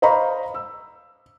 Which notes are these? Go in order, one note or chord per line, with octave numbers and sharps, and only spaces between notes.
C5 D#5 F5 A#5 B5 C#6
E6